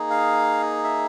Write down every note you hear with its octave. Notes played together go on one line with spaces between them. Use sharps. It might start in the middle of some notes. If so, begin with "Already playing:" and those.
Already playing: A#3 D#4 G#4
F5
E5